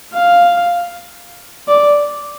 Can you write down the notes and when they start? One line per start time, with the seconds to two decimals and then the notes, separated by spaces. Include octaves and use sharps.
0.14 F5
1.68 D5